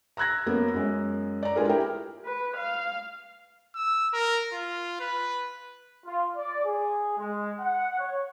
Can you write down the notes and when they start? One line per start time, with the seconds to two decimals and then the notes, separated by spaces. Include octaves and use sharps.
0.17 A#5 E6 F#6 G#6 A#6
0.46 F#2 A#3 B3
0.74 F#2 G#3
1.43 D5 A#5
1.55 G#3 D4 F4 G#4 A#4 B4
1.69 E4 G4 A#4
2.25 B4
2.56 F5
3.75 E6
4.13 A#4
4.52 F4
5.00 B4
6.06 F4
6.37 D5
6.65 G#4
7.18 G#3
7.60 F#5
8.00 C#5